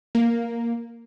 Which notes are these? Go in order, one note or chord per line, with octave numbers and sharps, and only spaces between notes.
A#3